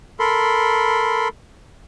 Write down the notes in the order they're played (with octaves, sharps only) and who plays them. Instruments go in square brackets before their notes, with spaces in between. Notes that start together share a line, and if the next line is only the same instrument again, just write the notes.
[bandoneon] A4 A#4 B5 C6